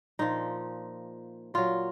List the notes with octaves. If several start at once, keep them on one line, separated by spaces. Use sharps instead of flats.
A#2 F3 D#4
A#2 F#3 F4